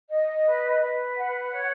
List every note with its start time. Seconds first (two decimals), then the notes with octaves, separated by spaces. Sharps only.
0.10 D#5
0.45 B4
0.80 B4
1.16 F#5
1.52 C#5